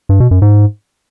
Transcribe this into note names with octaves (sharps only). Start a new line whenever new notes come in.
G2
B2
F#2
G#2